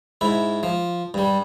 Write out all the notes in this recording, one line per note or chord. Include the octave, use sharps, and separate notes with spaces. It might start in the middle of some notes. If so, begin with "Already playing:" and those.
G#2 E4
F3
G2 G3